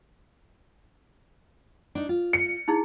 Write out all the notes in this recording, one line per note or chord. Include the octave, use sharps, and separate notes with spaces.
D4 D#4
F4
C#7
D#4 E4 G#4